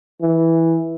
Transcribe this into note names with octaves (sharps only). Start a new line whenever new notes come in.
E3